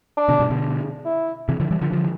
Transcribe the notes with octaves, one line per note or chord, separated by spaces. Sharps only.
D4
B2 D3
G2 B2
B2 D3
E4
C3 E3
D3 F3
E3 G3
D3 F3
D3 F3